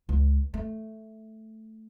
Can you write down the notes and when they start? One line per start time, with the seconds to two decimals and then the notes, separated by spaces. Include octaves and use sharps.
0.09 C#2
0.54 A3